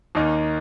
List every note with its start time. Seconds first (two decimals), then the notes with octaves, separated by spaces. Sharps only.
0.15 D#2 D#3 A#3 D#4